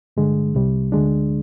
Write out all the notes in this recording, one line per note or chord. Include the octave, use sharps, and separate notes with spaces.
G2 D3 G#3
C2 C3 G3
D2 D3 G#3 D4